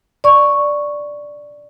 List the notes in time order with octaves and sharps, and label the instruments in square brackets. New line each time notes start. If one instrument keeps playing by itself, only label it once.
[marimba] D5 C#6